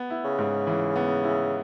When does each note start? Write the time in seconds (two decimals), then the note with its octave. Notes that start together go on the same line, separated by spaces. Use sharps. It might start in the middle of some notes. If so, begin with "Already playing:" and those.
Already playing: B3
0.10 E4
0.25 C#3
0.38 G#2
0.67 E3
0.96 B3
1.24 E4